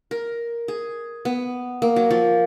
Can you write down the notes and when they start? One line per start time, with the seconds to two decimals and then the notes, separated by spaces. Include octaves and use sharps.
0.11 A#4
0.68 G#4
1.25 B3
1.82 A#3
1.96 F#3
2.11 F3